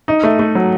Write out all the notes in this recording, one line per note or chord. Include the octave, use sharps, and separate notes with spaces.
D#4
A3
A3
F#3